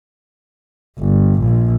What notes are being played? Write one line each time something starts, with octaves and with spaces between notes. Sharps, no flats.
G1
A#1